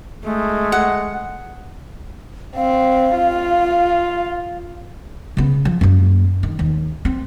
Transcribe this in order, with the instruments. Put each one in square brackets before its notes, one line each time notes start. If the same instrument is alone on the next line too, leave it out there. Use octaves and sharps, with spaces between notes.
[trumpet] G#3 [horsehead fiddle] A3
[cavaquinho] F#5
[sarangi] C4 [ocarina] F5
[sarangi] F4
[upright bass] C#3 B3
F3
F#2 A#3
D#3
D#2
C4